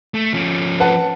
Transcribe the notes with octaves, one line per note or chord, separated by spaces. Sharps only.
A3
F3 C#4
B4 F#5 A5